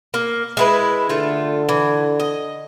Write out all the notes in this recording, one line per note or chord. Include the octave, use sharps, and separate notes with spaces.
A#3
G#3 E4 B4
D3 A3 F4
E3
D#5